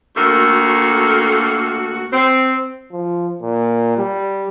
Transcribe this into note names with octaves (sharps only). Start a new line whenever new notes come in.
D2 D#3 A3 A#3 F#4 A4
C4
F3
A#2
G3